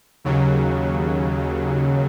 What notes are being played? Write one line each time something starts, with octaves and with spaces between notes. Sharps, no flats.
D#2 C#3 F#3